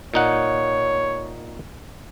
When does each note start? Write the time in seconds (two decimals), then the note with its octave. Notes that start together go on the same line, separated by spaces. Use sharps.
0.14 A#2 D#4 C#5 F#5